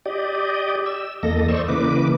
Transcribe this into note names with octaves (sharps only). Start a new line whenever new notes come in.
G4 D5 D#5
E6
E2 A#3 A4 D#5 A#6
C5 D5 D#5 C#6 E6
C#3 E3 A#3 B4 D6